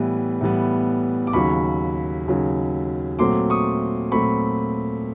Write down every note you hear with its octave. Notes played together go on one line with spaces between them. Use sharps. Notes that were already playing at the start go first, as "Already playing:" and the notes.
Already playing: A2 E3 G3 B3
A2 E3 G3 B3
D6
D#2 C#3 F#3 B5 C#6
D#2 C#3 F#3
A#2 F#3 A3 C4 C6 D6
C#6 D#6
A#2 F#3 A3 C4 B5 C#6